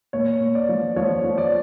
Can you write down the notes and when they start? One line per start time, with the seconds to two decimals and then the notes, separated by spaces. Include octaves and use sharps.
0.13 A#2 C#5
0.40 A#2
0.55 D5
0.69 F3
0.96 F3 C#5
1.24 F3
1.38 D5